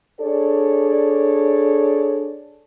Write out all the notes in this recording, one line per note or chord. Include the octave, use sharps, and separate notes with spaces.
D4 G#4 A4 C#5 D5